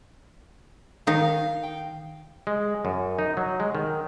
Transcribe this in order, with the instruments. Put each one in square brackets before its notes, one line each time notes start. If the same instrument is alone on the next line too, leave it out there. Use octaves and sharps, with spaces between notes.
[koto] D#3 D#4 [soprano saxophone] F5
[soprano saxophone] G5
[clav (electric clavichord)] G#3
F#2
D#4
F#3
G#3
D#3